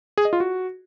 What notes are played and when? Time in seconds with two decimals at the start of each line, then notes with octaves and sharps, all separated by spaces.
0.18 G#4
0.25 D#5
0.33 F4
0.40 F#4